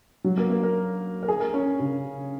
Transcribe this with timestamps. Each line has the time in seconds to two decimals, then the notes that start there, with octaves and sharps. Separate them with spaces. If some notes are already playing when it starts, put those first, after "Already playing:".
0.24 F#3
0.38 A#3
0.50 A#3
0.63 A#4
1.23 A#4
1.28 G#4
1.40 A#4
1.54 C#4
1.80 C#3